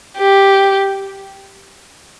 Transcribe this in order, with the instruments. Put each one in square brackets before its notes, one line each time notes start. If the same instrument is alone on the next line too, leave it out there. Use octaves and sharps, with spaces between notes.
[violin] G4